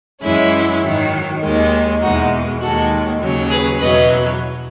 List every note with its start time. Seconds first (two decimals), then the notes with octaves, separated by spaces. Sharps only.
0.22 F#2 E3 G#3 C#4 E4
0.81 G#2 D#3 F#3
1.41 D#2 D#3 G#3
2.01 E2 B2 G#3 D#4 F#4
2.61 D#2 D#3 G#3 F#4 A4
3.20 D#2 C#3 F#3
3.51 G#4 B4
3.80 E2 B2 F#3 B4 D#5